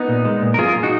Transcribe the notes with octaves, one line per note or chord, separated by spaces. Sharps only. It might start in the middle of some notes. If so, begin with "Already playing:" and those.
Already playing: B3 D#4
A#2
G#3
A#2
A#4
F#2 F4 G#4
D#4 F#4